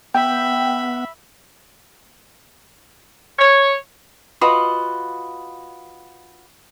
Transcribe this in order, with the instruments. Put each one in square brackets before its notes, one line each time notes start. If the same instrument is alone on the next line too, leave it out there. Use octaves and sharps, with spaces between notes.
[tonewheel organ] B3 F#5 [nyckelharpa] E5 B5 [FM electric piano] G5
[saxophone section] C#5
[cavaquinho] F4 F#4 B4 D#5